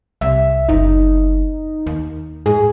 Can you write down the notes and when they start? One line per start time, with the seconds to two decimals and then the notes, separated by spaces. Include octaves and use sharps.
0.21 C2 E5
0.69 F#1 D#4
1.87 D#2
2.46 G#2 G#4